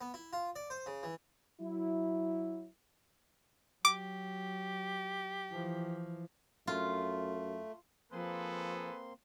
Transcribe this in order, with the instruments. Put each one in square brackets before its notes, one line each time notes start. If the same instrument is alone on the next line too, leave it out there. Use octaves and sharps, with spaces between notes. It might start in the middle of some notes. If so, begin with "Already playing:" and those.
[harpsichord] B3
E4
F4
D5
C5
C#3
E3
[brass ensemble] F#3 E4
[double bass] F#3 [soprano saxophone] G4 [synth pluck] D6
[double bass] E3 F3
[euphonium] F#2 [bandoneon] A3 [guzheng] F4
[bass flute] F3 [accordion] A#3 C4 C6 [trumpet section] G#4 B4 [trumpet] A4